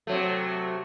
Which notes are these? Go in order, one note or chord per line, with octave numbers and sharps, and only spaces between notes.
C3 F#3 A3